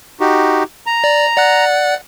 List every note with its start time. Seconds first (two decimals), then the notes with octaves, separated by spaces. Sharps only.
0.20 D#4 F#4 G4
0.86 A#5
1.04 D5
1.36 D5 F#5 F#6